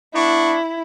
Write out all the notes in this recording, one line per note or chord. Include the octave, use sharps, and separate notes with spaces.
B3 D4 E4 C#6